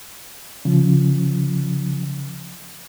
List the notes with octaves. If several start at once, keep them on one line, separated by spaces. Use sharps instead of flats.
C#3 F3